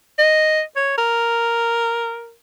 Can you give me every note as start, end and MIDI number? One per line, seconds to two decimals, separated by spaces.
0.19 0.62 75
0.76 0.97 73
0.98 2.33 70